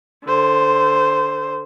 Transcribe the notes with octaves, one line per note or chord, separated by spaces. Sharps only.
D3 C5